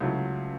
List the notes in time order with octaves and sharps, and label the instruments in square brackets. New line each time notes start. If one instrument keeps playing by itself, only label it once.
[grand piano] C#2 C#3 F#3 A3 E4